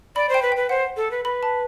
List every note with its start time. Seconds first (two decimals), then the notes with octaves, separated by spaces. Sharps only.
0.16 D5 B5
0.29 C5
0.34 G5
0.42 B4
0.52 G5
0.56 B4
0.69 C5 F#5
0.97 A4
1.11 B4
1.25 B4 B5
1.43 A5